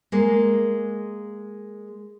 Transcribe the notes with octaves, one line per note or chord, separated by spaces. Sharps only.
G#3 A#3